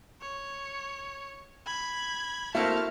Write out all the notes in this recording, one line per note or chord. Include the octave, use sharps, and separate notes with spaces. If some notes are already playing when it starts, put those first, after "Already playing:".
C#5
B5 G#6
A3 A#3 C4 E4 F#4 A5 F6